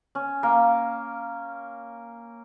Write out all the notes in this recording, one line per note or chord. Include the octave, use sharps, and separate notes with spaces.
C#4
A#3